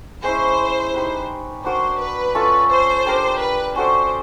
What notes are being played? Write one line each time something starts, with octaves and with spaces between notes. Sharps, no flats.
G#3 C#4 E4 C5
D#4 G4 B4
D4 F#4 A#4 C5
B4
C#4 F4 A4 C#5
C5
D4 G4 A#4
B4
C#4 F#4 A4 C5 D5